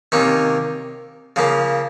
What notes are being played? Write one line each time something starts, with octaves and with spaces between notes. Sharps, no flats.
C3 D#3 A#3 C#4
C#3 F3 A#3